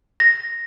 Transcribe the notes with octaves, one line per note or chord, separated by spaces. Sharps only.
A#6